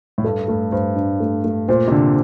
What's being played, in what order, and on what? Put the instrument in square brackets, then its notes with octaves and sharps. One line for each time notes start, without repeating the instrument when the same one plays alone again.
[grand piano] A2
[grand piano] G2 [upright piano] A4
[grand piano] G2 [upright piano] A3
[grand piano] G2 [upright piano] C5
[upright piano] D4
A3
A3
[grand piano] A#2 [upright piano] C5
[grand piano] C3
[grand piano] D3 [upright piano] D4